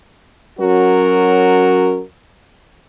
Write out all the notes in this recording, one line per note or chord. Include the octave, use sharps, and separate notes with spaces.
F#3 C#4 F#4 A#4